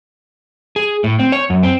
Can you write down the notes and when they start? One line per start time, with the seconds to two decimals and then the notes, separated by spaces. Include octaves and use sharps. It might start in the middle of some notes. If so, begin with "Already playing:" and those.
0.76 G#4
1.04 A2
1.19 C4
1.32 C#5
1.50 F#2
1.63 C4